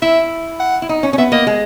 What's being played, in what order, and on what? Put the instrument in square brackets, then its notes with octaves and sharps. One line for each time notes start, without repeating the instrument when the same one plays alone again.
[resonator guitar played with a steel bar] E4 [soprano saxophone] E5
[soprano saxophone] F#5
[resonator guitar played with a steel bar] E4
D#4
C#4
C#4
[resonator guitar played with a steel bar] B3 [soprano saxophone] E5
[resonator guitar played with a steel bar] A#3 [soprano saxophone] D#5
[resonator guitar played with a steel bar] G#3